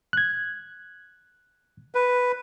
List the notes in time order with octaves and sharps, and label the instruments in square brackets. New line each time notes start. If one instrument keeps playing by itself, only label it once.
[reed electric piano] F#6 G#6
[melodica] B4